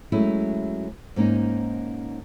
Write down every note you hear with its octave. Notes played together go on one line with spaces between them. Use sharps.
F#3 G#3 A3 C#4 E4
G#2 A#3 C#4 D#4